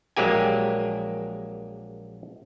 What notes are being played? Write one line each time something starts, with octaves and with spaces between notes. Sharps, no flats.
A#1 F#3 G#3 A#3 G4 G#5